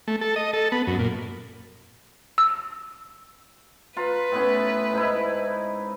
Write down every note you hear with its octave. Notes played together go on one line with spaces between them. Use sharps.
A3
A4
D#5
A4
B3
F#2
A#2
E6
F4 B4 A#5
A2 B3 C#4
G#2 D#4 E4